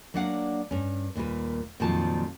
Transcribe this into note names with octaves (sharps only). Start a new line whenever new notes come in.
F#3 A#3 D4 F5 F#5
G2 C#4
D#2 A#2 G3 B4
F2 A#2 D#3 F3 F#3 A5